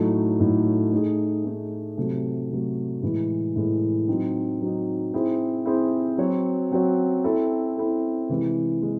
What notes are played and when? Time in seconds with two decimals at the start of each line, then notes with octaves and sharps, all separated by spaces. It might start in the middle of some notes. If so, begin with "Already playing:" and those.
Already playing: A2 F#3 A3 D#4 A4
0.39 A2 F#3 A3 D#4 A4
0.91 A3 D#4 G#4
1.44 A3 D#4 G#4
1.97 C3 F#3 A3
2.50 C3 F#3 A3
3.02 A2 E3 G#3
3.56 A2 E3 G#3
4.08 F#3 C4 D#4
4.61 F#3 C4 D#4
5.14 C4 E4 G#4 C5
5.66 C4 E4 G#4 C5
6.18 F#3 C4 F#4 C#5
6.72 F#3 C4 F#4 C#5
7.24 C4 E4 A4
7.77 C4 E4 A4
8.29 C3 E3 G#3
8.82 E3 G#3